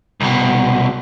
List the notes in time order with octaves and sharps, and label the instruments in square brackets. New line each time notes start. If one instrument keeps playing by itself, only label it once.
[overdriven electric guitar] C2 B2